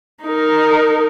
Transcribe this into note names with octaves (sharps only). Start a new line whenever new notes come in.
D#4 A#4